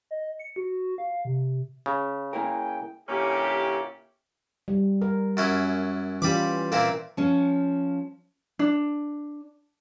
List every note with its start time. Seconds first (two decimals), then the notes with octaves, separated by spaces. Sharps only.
0.11 D#5
0.39 C#7
0.56 F#4
0.98 F5
1.25 C3
1.86 C#3
2.33 A#3 E4 A#4 G5 G#5
3.09 A#2 D3 C#4 E4 G4
4.68 G3
5.02 A#4
5.37 F#2 C#4 E4
6.22 E3 G3 C#4 F4 B5 D6
6.72 A#2 C4 E4 A#4
7.17 F3 C#4
8.59 D4